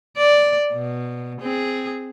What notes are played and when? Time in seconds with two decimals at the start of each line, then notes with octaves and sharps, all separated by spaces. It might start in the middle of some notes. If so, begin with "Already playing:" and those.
0.17 D5
0.73 B2
1.41 C4 G#4